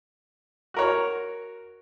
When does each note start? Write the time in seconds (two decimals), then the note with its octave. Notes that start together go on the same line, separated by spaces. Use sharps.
0.74 F#4 A#4 C#5